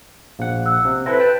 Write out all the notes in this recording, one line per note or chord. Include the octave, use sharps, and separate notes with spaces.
A#1 F5 F#5
E6 F#6
C3
C4 E4 A4 B4 F#6 A#6
G5 A5